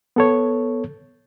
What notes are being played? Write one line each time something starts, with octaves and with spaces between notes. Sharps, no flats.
B3 A4 C#5